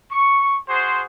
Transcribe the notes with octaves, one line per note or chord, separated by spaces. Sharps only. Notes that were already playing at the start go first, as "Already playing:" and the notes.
C#6
F#4 G#4 C5